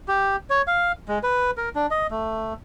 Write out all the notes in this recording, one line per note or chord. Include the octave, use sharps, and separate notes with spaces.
G4
C#5
F5
G#3
B4
A#4
D4
D#5
A3